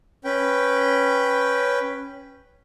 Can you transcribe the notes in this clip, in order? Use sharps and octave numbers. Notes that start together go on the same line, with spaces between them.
C#4 B4 G5